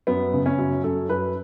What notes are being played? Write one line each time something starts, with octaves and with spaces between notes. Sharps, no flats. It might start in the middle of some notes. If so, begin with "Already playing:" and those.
F#2 B3
C#3
C#4
F#2
F#2 A4
F#2 B4